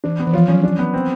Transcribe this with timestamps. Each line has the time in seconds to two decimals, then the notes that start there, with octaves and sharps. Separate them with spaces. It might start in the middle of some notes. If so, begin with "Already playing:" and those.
0.04 E3 D4
0.20 B3
0.27 E3
0.33 F3 F4
0.48 F#3 C#4
0.63 D4
0.79 B3
0.94 C4